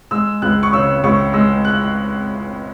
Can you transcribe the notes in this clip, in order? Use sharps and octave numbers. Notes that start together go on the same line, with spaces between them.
G#3 E6
C#2 F#6
C#6
C#3 E6
C#2 C#6
G#3 E6
F#6